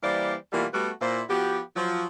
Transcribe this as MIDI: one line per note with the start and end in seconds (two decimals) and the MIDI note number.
0.03 0.35 52
0.03 0.35 55
0.03 0.35 58
0.03 0.35 72
0.03 0.35 74
0.53 0.66 47
0.53 0.66 52
0.53 0.66 55
0.53 0.66 57
0.53 0.66 58
0.53 0.66 65
0.73 0.91 55
0.73 0.91 57
0.73 0.91 59
0.73 0.91 66
1.01 1.22 46
1.01 1.22 64
1.01 1.22 72
1.30 1.60 53
1.30 1.60 59
1.30 1.60 66
1.30 1.60 67
1.76 2.05 53
1.76 2.05 54